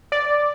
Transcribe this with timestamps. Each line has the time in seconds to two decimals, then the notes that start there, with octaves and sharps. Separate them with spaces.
0.12 D5